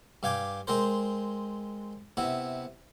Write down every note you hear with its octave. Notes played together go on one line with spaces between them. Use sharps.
G2 F5 G5 G#5 D6
G#3 C4 A#4 C5
C3 B3 E4